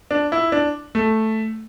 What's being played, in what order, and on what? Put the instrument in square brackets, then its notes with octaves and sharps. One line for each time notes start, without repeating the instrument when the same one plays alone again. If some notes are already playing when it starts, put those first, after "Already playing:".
[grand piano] D4
E4
D4
A3